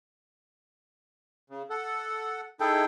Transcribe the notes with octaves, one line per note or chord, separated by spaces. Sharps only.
C#3
A4 F#5
D#4 E4 G#4 A4 G5